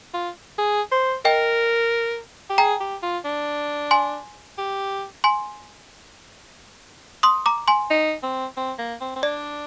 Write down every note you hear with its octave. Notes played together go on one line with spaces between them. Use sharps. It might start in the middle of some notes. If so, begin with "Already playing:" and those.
F4
G#4
C5
A#4 D#5 G5
G4
G#4 G5 A#5
G4
F4
D4
G#5 C6
G4
G#5 C6
C6 D#6
A#5 D6
G#5 C6
D#4
C4
C4
A#3
C4
C4
D4 D5